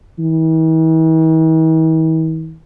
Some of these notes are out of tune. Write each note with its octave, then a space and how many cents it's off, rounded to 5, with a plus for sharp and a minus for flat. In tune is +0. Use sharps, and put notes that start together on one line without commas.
E3 -45